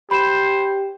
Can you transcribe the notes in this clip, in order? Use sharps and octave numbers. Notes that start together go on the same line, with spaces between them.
G4 C5 B5 E7